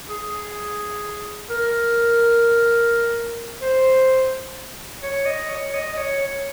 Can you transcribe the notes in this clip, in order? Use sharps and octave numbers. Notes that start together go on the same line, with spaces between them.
G#4
A#4
C5
C#5
D#5
C#5
D#5
D#5
C#5
C#5